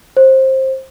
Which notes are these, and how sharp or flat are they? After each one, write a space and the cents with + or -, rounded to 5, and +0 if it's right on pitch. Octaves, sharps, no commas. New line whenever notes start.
C5 +20